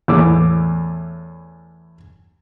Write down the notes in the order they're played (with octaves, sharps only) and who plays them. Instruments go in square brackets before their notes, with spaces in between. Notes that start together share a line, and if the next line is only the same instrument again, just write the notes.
[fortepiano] E2 A2 D6 E6